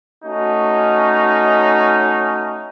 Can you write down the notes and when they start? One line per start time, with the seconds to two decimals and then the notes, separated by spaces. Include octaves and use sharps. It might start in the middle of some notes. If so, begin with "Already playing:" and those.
0.24 A3 C#4 D#4 F#4